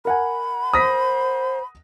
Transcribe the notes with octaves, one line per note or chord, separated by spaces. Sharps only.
A#4 F#5 G#5 B5
C5 D#6 A#6 B6